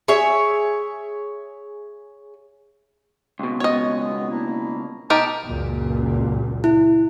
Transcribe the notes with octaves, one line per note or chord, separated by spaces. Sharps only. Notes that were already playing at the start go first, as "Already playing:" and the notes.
G#4 C#5 E5
C#2 B2
G#3 B3 C#5 D#5
A#3 D4 E4
B2 B3 D#4 G4 A#4 A5
C#2 F#2 A#2
E4